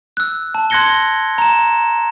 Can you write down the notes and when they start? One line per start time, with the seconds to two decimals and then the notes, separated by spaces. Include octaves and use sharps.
0.17 E6 F#6
0.55 A5
0.70 C6 F#6 G#6 A#6 C#7 G7
1.38 A#5 E7